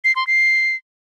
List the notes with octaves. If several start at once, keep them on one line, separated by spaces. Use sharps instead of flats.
C7
C6
C7